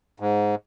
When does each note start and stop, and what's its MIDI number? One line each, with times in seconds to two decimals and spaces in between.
0.20 0.55 44